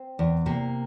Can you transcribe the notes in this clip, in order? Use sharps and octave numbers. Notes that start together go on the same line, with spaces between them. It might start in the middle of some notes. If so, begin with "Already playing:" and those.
Already playing: C4
E2
C3 A#3